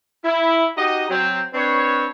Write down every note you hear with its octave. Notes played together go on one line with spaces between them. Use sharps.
E4
D#4 F#4 G4 D#5
F#3 C4
C4 D4 B4 C#5